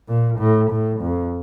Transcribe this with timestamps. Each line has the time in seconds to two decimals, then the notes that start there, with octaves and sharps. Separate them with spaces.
0.08 A#2
0.39 A2
0.71 A2
1.01 F2